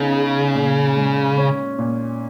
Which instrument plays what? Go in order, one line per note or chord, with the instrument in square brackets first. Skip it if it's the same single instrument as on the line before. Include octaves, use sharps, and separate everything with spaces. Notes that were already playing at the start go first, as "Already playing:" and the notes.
Already playing: [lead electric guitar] C#3 [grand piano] B3 D#4
[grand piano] G#4
A#2
G#3
C#4
A#2